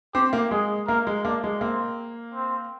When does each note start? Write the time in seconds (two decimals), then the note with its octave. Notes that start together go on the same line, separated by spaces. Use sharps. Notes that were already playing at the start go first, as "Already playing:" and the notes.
0.15 C4 G4
0.33 A#3
0.51 G#3 G#4
0.88 A#3 A#4
1.07 G#3
1.25 A#3 D4
1.44 G#3
1.61 A#3 C4
2.35 C4